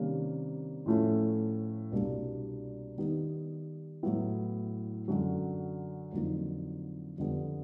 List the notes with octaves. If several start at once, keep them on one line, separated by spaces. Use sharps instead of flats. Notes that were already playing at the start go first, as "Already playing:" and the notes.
Already playing: C3 D#3 G3 A#3 C#4
A2 F3 A3 C#4 E4
C2 B2 G3 A#3 D4
D#3 G3 B3 D#4 G4
A2 F#3 B3 E4
F#2 D3 F#3
F2 D3 F#3 A#3 D#4
F2 D3 G3 B3